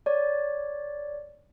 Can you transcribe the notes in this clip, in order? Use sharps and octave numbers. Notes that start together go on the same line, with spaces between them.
C#5 D5